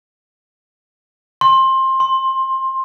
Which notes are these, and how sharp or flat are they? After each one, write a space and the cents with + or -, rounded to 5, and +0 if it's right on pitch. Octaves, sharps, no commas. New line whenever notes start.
C6 +20
C6 +5